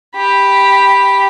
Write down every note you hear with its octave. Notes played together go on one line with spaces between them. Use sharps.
G4 B5